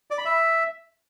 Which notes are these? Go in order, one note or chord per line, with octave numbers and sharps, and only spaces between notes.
D5
B5
E5